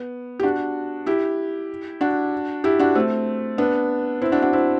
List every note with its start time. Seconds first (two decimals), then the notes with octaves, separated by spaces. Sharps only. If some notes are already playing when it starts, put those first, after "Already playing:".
Already playing: B3
0.40 G4
0.43 D4 F#4
1.06 E4 G4
2.01 D4 F#4
2.64 E4 G4
2.79 D4 F#4
2.95 A3 C4
3.58 B3 D4
4.22 C4 E4
4.32 D4 F#4
4.42 D4 F#4
4.53 C4 E4